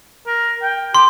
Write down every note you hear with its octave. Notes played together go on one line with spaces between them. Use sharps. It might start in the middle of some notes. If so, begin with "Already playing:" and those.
A#4
G5
G4 C6